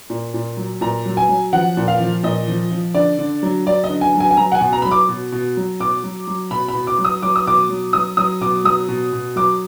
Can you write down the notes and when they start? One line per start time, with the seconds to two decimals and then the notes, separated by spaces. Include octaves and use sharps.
0.10 A#2
0.34 A#2
0.57 F#3
0.81 A#2 A#5
1.06 F#3
1.17 G#5
1.29 F#3
1.53 F3 F#5
1.77 A#2
1.88 F5
2.00 F3
2.23 A#2 D#5
2.48 F3
2.71 F3
2.95 D3 D5
3.19 D3
3.43 F#3
3.66 F#3 D5
3.84 D#5
3.89 D3
4.01 G#5
4.14 F#3
4.20 G#5
4.31 G#5
4.37 F#3 A#5
4.52 F#5
4.55 G#5
4.61 B2
4.73 A#5
4.82 F#3 B5
4.91 D6
5.09 B2
5.32 B2
5.57 F#3
5.80 B2 D6
6.04 F#3
6.27 F#3
6.51 B2 B5
6.68 B5
6.74 B2
6.87 D6
6.99 F#3
7.05 D#6
7.22 F#3 D6
7.36 D#6
7.47 B2 D6
7.69 F#3
7.93 F#3 D#6
8.17 F#3 D#6
8.41 B2 D6
8.64 F#3 D#6
8.88 B2
9.13 B2
9.36 F#3 D6